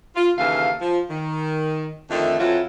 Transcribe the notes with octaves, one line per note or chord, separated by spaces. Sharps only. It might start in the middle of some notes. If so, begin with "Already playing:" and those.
F4
D#2 C#3 E3 A4 F5
F3
D#3
F2 D3 D#3 A3 D#4 E5
F2 E3 F#3 E4 F4